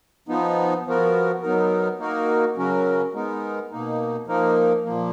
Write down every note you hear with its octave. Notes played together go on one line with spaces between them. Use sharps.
F3 B3 D#4
F3 B3 F#4 A#4
F#3 B3 D#4 A#4
A#3 D#4 F#4 A#4
C#3 F#3 C#4 F#4 A#4
G#3 B3 D#4 A#4
B2 A#3 D#4
F3 A#3 D#4 A#4
A#2 F3 A#3